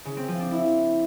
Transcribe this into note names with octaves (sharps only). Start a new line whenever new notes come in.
C#3
C4
F3
D4
E4